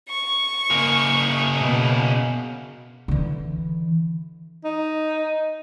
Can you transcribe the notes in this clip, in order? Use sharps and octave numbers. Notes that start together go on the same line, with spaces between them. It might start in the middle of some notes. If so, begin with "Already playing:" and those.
C#6
C#3 A#3
B2
D3 E3
D#4